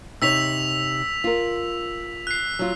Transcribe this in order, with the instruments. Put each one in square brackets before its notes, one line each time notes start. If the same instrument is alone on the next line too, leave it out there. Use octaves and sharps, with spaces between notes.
[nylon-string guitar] C3 D#4 C#5 [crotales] E6 B6 F7
[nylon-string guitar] F4 A#4
[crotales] F#6 C7
[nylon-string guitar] F#3 F4